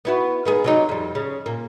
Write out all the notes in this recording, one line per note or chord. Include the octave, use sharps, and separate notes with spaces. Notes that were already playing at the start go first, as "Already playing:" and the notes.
B3 E4 F#4
D#3 B3 G#4
C3 F#3 D#4
F2 G3
C#3
A#2 A#3